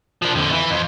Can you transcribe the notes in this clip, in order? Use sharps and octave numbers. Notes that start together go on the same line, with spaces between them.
F3 D4
F2 D3
E3
F2